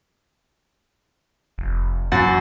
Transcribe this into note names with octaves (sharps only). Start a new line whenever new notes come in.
F1
F#2 E3 F#5 A6